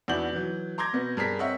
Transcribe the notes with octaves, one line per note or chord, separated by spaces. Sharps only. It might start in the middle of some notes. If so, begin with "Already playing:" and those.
E2 D4 E4 F#4 G6 F#7
E3 F#3
A#5 C6 D6 G6 G#6 A#6
B2 B3
G2 G#4 A#4 B6
C4 A#4 C#5 D#5 E5 F#5